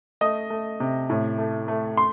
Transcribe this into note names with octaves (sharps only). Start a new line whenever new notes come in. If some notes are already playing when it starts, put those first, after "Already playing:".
A3 D#5
A3
C3
A2
A3
A3
C6